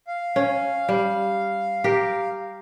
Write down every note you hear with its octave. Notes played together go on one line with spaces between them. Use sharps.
F5
C#4
G3
G4 A#4